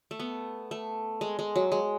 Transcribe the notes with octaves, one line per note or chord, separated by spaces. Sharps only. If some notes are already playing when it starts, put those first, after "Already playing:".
A3
B3
A3
G#3
G#3
F#3
G#3